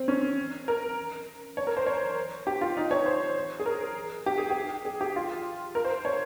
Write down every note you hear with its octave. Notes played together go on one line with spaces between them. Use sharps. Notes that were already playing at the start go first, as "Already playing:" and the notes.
Already playing: C4
C#4
A#4
C#5
A#4
C5
C#5
G4
F4
D#4
C#5
C5
G#4
A#4
G4
G#4
G4
G#4
G4
F4
A#4
C5
C#5